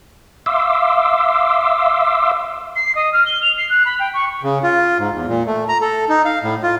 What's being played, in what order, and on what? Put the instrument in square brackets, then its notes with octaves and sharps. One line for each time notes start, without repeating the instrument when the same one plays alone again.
[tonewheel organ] E5 F5 C6 D6 E6
[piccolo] C7
D#5
F6
G7
F7
C7
F#6
B5
G5
C#6
[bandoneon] C#3
F4
G#2
E2
A#2
A3
A#5
A4
D#4
F5
A2
F4